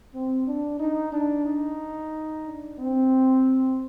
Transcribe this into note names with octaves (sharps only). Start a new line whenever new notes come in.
C4
D4
D#4
D4
D#4
D4
C4